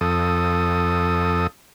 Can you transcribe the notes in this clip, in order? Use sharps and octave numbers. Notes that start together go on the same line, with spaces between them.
F2 A4 D#6